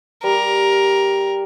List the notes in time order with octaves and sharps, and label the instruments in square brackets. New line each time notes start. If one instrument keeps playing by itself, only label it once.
[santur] G3 [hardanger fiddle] A#4